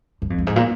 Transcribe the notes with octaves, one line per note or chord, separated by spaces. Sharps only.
G2
F2
G2
G#2
A#2